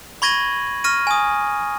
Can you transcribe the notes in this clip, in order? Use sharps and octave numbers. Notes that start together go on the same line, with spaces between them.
B5 C#6 G#6 A#6 D#7 F#7
C#6 F6 A#6 D#7
G#5 D#6